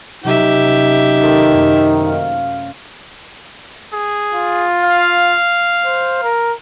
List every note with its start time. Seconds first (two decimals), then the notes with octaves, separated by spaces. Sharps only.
0.24 C3 F#3 C#4 D#4 G4 E5
1.23 D#3 A4 A#4 C5
1.52 F#2 A3 A#3
2.01 C#4 F5
3.93 G#4
4.34 F4
4.84 F5
5.85 C5
6.23 A#4